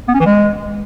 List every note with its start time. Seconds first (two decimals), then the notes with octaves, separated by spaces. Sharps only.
0.08 B3
0.14 C#4
0.20 E3
0.26 G#3